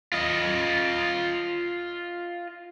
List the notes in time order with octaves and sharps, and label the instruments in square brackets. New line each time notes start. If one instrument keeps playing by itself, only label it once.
[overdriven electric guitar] F4 D#5